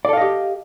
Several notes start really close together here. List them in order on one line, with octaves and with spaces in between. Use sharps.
D5 A4 F5 D#5 G4